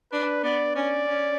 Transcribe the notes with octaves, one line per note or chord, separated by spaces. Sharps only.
D4 B4
B3 D5
C#4 D5
C#4